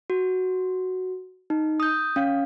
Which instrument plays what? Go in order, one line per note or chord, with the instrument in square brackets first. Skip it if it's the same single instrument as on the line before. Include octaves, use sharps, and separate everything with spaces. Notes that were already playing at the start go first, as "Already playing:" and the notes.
[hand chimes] F#4
D#4
D#6 G6
C#4 F5